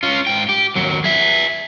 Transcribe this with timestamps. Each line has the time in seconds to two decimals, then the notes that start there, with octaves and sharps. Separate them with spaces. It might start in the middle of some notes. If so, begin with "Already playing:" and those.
0.03 C#4 F4
0.27 G#2 G5
0.49 G4
0.75 D#2 F#3
1.04 G#4 E5